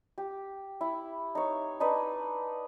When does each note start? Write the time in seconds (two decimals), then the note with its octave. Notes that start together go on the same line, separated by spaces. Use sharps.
0.18 G4
0.81 E4
1.35 D#4 C#5
1.80 D4 D#4 B4 D#5